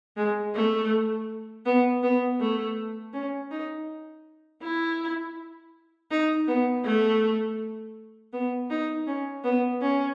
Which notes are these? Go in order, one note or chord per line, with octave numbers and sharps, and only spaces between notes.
G#3
A3
B3
B3
A3
C#4
D#4
E4
D#4
B3
A3
B3
D#4
C#4
B3
C#4